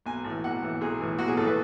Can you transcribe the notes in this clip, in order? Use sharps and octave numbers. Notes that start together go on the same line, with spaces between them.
B1 G#5
A2 E3
B1 F#5
A2 E3
B1 G#4
A2 E3
B1 F#4
G#4
A2 E3 A4
B4